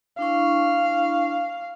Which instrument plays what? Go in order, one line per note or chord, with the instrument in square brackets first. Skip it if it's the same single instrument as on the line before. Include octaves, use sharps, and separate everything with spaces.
[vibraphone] D4 E4 C#6 [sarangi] F5